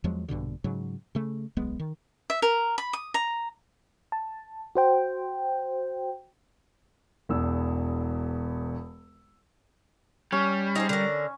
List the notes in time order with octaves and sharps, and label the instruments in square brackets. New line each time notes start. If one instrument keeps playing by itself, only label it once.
[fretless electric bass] E2 F3 F#3 G#3
A#1 G2 B2 D3
G#2 C#3 F#3
C#3 A3
D1 B1 G#3 B3
D#3
[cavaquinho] E5
A#4
B5
D#6
A#5
[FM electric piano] A5
F#4 C5 G5
[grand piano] E1 E2 E6
[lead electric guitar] G3 [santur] C#4
[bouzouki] D#4 G#4 C5
D3 A#4